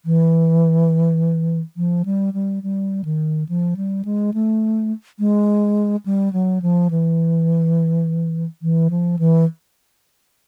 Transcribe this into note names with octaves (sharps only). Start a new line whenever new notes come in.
E3
F3
G3
G3
G3
D#3
F3
G3
G#3
A3
G#3
G3
F#3
F3
E3
E3
F3
E3